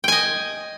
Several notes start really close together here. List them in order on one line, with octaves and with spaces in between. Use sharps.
G5 G#5 D#5